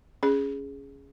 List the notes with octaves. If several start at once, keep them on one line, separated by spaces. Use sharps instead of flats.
C#4 G#4